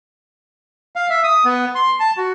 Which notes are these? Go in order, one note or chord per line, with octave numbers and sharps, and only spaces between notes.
F5
E5
D#6
B3
C6
A5
F#4